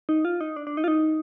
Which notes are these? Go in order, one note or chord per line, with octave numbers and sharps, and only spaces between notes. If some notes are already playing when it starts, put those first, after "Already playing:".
D#4
F4
D#4
D4
D4
D#4
F4
D#4